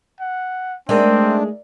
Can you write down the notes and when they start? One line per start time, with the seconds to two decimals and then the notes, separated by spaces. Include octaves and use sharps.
0.20 F#5
0.89 G#3 A3 C4 D4 D#4 A#4 D5 E5